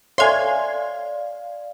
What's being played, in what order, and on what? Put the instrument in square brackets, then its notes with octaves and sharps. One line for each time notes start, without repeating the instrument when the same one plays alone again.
[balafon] A4 E5 [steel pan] C#5 G#5 [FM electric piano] D5 F5 [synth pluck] C6 G#6